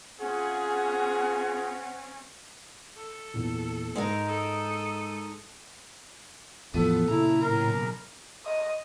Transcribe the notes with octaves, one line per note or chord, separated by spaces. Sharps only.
C4 C#4 F4 G#4 F#5
A4
E2 A#2
G#2 G#3 D#4 A#4
A4 D#6
E2 A2 F3 B3 A4
B1 A#2 C#3 E4 A#5
A2 A#4
D#5